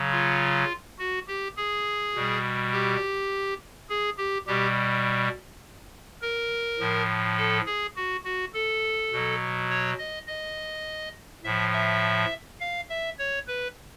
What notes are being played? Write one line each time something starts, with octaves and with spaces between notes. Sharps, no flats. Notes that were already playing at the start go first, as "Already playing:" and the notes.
Already playing: C#3 F#3
F4
F#4
G4
G#4
B2 G3
G4
G#4
G4
B2 G3 G4
A#4
A2 F3
A4
G#4
F#4
F#4
A4
B2 F#3
C#5
D#5
D#5
A2 F3 E5
E5
F5
E5
C#5
B4